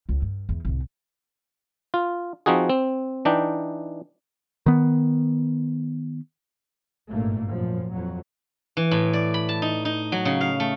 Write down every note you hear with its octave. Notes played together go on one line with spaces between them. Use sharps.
C#2
G2
E2
C2 A2
F4
F3 C4 D#4 F#4 G#4
C4
E3 D4 D#4 G5
D#3 B3
G#1 G2 A#2 A3 A#3
F#2 A#2 F3
F2 F#3
E3
A2
D5
B5
A5
D#4
D#4
F#3
C#3
F5
A3